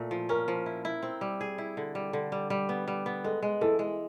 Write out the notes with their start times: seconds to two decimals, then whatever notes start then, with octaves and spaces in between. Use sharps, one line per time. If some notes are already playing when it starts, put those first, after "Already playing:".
Already playing: A#2 A3
0.11 F3
0.29 C#4 A#4
0.48 F3
0.66 E4
0.85 E4
1.03 C4
1.21 G3
1.41 G#4
1.58 E4
1.77 D3
1.95 G3
2.13 D3
2.32 G3
2.50 G3
2.69 B3
2.88 G3
3.06 B3
3.24 G#3 A4
3.42 G#3
3.61 E3 A4
3.79 G#3